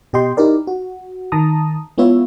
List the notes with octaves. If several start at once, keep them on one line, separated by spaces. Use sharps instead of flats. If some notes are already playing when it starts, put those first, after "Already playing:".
B2 G4 D#5 G5 C6
D#4 E4 G4 A#4 D5
F#4
D#3 A5 A#5 D#6
G#3 B3 E4 F4 C#5 E5